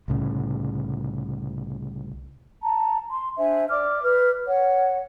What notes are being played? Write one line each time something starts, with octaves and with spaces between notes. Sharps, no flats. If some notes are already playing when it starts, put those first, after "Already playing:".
C2 A2 C#3
A5 A#5
C6
D4 C5 E5 G#5
D5 D6 F6
B4 F6
C#5 F#5